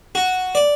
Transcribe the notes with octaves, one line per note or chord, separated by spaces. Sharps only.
F#4
D5